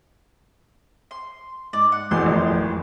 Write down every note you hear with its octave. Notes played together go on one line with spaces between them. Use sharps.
C6
G#2 D5
F#5
E1 A1 E2 C6
G#1 F2 A2